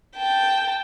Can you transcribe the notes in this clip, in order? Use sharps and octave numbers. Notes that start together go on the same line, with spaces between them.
G5 A5